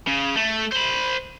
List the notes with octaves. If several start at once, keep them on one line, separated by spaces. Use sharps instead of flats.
C#3
A3
C5 B5